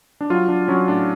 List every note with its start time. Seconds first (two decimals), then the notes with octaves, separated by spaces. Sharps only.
0.21 D4
0.30 F#3 F4
0.48 F#3 D4
0.68 F#3 C#4
0.88 A2 D4